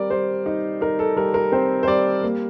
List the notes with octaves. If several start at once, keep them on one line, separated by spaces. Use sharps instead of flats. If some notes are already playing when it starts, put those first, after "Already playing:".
Already playing: G3 C4 A#4 D5
G3 C5
D#4
D#4 A#4
A4
G3 A#4
A#4
C4 C5
C5
G3 D5
A#3